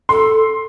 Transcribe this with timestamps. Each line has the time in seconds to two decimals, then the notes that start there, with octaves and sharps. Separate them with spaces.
0.09 A4 C6